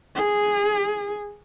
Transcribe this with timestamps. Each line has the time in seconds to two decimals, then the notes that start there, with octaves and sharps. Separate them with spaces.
0.15 G#4